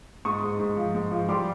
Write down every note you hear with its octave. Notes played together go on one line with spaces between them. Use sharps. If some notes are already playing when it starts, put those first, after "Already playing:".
G#2 C#6 D#6
G#2
G#2
F3
G#2
F3
G3 C6 D6